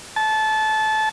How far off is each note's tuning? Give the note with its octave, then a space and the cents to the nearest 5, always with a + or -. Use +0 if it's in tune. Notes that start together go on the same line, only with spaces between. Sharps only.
A5 -20